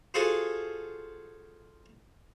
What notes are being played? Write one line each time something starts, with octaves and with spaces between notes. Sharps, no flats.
F4 F#4 G#4 A4 C5 F5